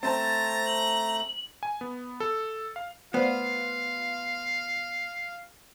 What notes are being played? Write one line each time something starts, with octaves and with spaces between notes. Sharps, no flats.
A3 C4 C5 A5 A#5 A6
F#7
G#5
B3
A4
F5
A3 B3 F4 C5 D5 F5